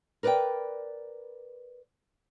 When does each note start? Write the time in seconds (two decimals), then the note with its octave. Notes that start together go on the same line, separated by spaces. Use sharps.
0.23 A#4 B4 D5 D#5 G5